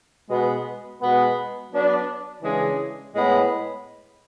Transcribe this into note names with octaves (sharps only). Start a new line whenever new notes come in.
B2 G#3 B3
B2 G#3 B3
F#3 B3 D4
C#3 E3 G#3 D4 G#4
A2 G#3 B3